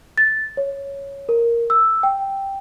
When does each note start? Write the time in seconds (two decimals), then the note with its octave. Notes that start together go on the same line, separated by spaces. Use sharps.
0.18 A6
0.57 C#5
1.29 A#4
1.70 E6
2.03 G5